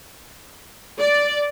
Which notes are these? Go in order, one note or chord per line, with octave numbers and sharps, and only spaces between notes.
D5